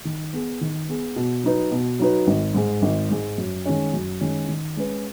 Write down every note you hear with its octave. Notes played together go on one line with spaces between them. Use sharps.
D#3
B3 G#4
D#3
B3 G#4
B2
F#3 D#4 B4
B2
F#3 D#4 B4
G#1
G#2 G#3
G#1
G#2 G#3
F#2
D#3 G#3 C#4
F#2
D#3 G#3 C#4
D#3
G#3 C#4 G#4 B4